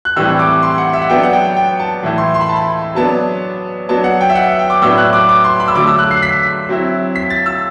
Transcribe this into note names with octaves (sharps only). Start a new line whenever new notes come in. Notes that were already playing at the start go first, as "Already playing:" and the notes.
F#6
A2 E3 G3 C4 E6
D6
C6
F#5
E5
F#5
F#3 B3 D4 G5
F#5
G5
G5
A5
A2 E3 A3 E4
C6
C6
B5
A5
B5
F#3 B3 D4 A5
F#3 B3 D4 A5
F#5
G5
E5
F#5
G5
D6
A2 F#3 B3 D4 E6
F#6
D6
D6
C6
B5
E6
D3 F#3 A3 D6
E6
F#6
C7
B6
F#3 C4 E4
B6
A6
E6